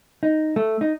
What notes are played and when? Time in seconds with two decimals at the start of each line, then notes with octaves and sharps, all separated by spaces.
0.23 D#4
0.56 A3
0.81 D#4